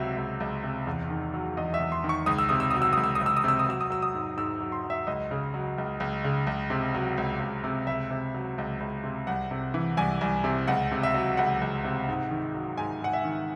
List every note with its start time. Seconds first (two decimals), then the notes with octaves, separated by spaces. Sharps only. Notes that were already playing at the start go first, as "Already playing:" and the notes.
Already playing: C#2 C3 F#3 E5
0.17 C#2
0.40 C#2
0.63 C3
0.87 E2
1.10 D#3
1.34 F#3
1.57 E2 D#5
1.74 E5
1.80 E2
1.92 C6
2.04 D#3
2.09 C#6
2.26 C#2 D#6
2.38 E6
2.49 C3 D#6
2.60 E6
2.71 F#3 D#6
2.82 E6
2.93 C#2 D#6
3.04 E6
3.15 D#6
3.21 C#2
3.26 E6
3.37 D#6
3.44 C3 E6
3.59 D#6
3.67 F#3 E6
3.81 D#6
3.90 F#3 E6
4.02 D#6
4.14 G#2
4.37 G#2 E6
4.61 F#3
4.72 C6
4.84 F#3
4.90 E5
5.07 C#2 D#5
5.31 C#3
5.54 F#3
5.78 C#2
6.00 C#2
6.24 C#3
6.47 C#2
6.70 C3
6.94 F#3
7.17 C#2
7.40 C#2
7.64 C3
7.87 C#2 E5
8.10 C3
8.34 F#3
8.58 C#2
8.80 C#2
9.04 C3
9.27 C2 F#5
9.51 C3
9.74 E3
9.97 C2 G#5
10.21 C2
10.44 C3
10.68 C#2 F#5
10.92 C3
11.03 E5
11.14 F#3
11.37 C#2 F#5
11.61 C#2
11.84 C3
12.08 G#2
12.31 D#3
12.54 F#3
12.78 G#2 G#5
13.01 G#2 F#5
13.13 E5
13.25 D#3